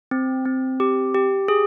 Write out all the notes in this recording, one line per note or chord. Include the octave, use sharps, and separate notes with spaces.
C4
C4
G4
G4
G#4